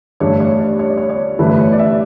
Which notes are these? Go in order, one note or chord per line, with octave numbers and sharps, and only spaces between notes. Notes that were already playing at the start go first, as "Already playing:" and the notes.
G2 E3 A3 D4 C#5
C#5
D5
C#5
D5
C#5
C#5
G2 E3 A3 E4 B4
B4
C#5
D5
E5